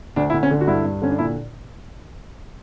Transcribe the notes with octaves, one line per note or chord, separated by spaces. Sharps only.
D2 D4
E4
D2
C#4
D3
F#4
G2 E4
G2
D3 C#4
D4
A#2 E4